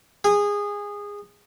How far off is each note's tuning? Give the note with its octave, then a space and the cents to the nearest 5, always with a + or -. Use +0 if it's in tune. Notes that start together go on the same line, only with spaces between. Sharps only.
G#4 -20